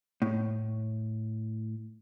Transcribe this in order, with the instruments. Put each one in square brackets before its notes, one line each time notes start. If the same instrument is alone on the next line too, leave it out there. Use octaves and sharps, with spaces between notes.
[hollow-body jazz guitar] A2